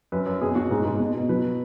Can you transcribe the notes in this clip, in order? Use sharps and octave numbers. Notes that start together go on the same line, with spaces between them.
F#2 B4
F#2
B2 G#4
B2 F#4
G#2 G#4
G#2
B2
B2
F#3 B4